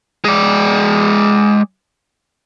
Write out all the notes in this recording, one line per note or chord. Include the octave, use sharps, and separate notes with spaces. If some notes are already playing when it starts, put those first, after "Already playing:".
G#3 D5